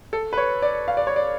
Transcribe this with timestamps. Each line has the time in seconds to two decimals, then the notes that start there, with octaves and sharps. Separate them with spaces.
0.13 A4
0.33 B4
0.37 C#5
0.62 D5
0.88 F5
0.97 D5
1.07 C#5
1.16 D5